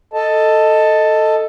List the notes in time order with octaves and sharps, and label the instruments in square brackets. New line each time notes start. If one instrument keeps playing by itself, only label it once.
[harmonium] A4 D#5 A5